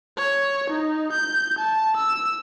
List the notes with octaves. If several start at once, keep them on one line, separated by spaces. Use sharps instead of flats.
C#5
D#4
G6
A5
E6